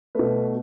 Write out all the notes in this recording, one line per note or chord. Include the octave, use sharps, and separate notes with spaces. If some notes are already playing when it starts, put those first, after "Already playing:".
B2 A3 B4